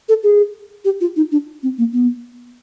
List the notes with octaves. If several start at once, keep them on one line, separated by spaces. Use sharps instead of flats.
A4
G#4
G4
F4
D#4
D4
C4
A#3
B3